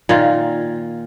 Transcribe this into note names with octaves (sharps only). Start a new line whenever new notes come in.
A#2 D#3 F4